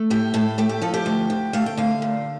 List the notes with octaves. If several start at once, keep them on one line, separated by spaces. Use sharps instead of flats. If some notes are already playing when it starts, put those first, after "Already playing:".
Already playing: A3
A2 G4
A2 A4
A3 G4
G4
F3 A4
G4
D2
D2
A3 F5
G5
D3 F5
A#2